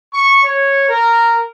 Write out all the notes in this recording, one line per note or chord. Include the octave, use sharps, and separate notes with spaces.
C#6
C#5
A#4